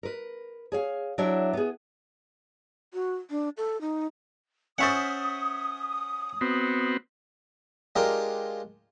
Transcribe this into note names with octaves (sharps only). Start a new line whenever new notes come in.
A#4 B4
G#4 C#5 F5
F#3 D4 E4 C#5 E5
B3 G#4
F#4
D4
A4
D#4
C#4 C5 E5 F#5 C#6 D#6 A6
B3 C4 F#4
G#3 D4 F4 G4 A#4